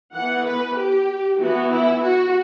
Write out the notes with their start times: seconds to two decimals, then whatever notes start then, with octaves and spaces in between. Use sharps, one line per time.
0.15 E3 B3 F#5
0.46 B4
0.78 G4
1.41 E3 B3 F#4
1.73 E4
2.04 F#4